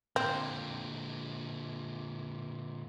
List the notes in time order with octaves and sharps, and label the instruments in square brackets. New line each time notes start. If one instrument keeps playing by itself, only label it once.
[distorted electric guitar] A#2 D3 [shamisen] C4